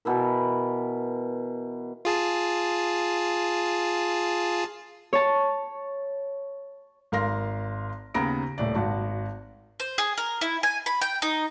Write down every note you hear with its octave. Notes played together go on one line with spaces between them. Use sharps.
B2 E3 A#4
F4 G#4 A5
C#5 A5
G#1 A#4 F5 C6 A#6
D#2 C#3 B3 A#5 A#6 D7
D#1 A2 D5
G#1 F#4 A5
C5
G#4
A#4
E4
G#5
B5
G5
D#4